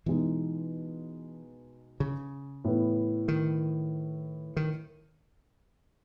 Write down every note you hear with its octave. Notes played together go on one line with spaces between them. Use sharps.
B2 E3 G#3 D#4
C#3
A2 E3 B3
D#3
D#3